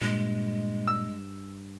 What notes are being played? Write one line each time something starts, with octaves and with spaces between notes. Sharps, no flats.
G2 A#2 G#3
E6